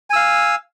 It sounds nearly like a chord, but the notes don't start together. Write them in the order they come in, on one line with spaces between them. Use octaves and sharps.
G#5 E6 F5